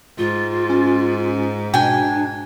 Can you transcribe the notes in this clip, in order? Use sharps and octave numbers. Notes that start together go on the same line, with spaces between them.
G#2 F4
C#4
B2 D4 G5 G#5